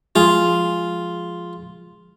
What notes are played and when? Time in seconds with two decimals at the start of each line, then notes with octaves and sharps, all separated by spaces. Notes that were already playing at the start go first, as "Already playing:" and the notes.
0.16 F3 G#3 F4 G#4